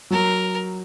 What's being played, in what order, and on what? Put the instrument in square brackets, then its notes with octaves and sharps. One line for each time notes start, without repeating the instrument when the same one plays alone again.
[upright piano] F#3 [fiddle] A#4